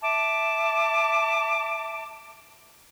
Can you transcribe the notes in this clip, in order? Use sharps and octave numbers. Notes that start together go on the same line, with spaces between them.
E5 A5 D6